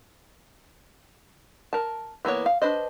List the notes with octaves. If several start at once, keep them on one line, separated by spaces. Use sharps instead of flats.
A#4 A5
E3 A#3 B3 C#5
F5
D4 B4 C5 D#5